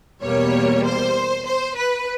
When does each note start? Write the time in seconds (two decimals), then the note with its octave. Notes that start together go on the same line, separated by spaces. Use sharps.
0.22 E2 B2 G3 A#3 C#5
0.84 C5
1.46 C5
1.76 B4